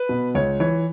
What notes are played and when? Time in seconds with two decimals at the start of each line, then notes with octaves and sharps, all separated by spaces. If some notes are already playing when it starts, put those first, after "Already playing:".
Already playing: B4
0.09 B2
0.35 C#2 C#5
0.60 E3 C#5